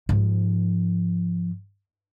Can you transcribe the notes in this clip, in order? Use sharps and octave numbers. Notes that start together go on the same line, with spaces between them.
G#2 F3